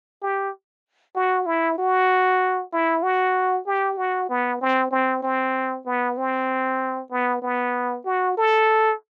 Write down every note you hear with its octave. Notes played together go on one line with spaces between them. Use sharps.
G4
F#4
E4
F#4
E4
F#4
G4
F#4
B3
C4
C4
C4
B3
C4
B3
B3
F#4
A4